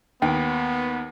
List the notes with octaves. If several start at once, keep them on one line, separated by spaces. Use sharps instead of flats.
D#2 B3 G5